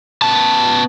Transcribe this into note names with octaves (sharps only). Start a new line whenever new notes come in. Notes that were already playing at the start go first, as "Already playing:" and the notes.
B3 A5